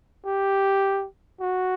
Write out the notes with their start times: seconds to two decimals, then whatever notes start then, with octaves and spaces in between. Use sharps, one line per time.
0.25 G4
1.41 F#4